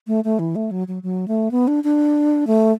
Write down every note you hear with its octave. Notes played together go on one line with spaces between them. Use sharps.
A3
A3
E3
A3
F#3
F#3
F#3
A3
B3
D4
D4
A3